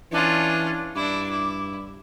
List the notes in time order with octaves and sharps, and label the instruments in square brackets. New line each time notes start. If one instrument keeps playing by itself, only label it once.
[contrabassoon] E3 [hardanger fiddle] C#4 F4 [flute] D4
[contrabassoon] G2 [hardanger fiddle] D4 E4 [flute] D6
[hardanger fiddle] E4